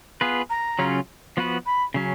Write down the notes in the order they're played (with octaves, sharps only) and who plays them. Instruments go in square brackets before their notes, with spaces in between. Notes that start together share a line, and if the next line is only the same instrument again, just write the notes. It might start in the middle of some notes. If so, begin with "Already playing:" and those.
[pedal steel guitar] B3 F4 G#4 B4
[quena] A#5
[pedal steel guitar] C#3 F#3 C#4 F4
F3 B3 F#4 B4
[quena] B5
[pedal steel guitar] C#3 F#3 C#4